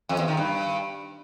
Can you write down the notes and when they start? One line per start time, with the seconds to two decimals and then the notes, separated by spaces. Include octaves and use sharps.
0.09 F2
0.19 E2
0.28 D#3
0.37 G2